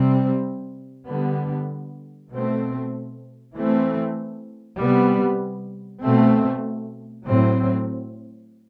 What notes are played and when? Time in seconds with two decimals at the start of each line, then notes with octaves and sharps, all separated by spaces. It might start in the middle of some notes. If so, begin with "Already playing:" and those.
Already playing: C3 G3 C4
1.08 D3 G3 B3
2.31 B2 A3 C4
3.55 E3 A3 C4
4.78 C3 G3 B3
6.02 B2 A3 C4
7.25 A2 F#3 C4